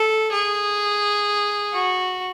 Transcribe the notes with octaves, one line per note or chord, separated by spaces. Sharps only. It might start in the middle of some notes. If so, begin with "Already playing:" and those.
Already playing: A4
G#4
F#4